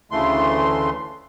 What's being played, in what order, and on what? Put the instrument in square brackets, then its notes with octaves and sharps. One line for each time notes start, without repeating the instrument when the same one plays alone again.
[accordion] D2 C#3 E3 A3 C6